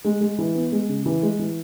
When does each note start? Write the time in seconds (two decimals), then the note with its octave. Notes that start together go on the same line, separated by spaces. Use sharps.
0.04 G#3
0.21 G#3
0.38 E3
0.55 B3
0.72 G#3
0.89 C#3
1.06 E3
1.22 G#3
1.39 E3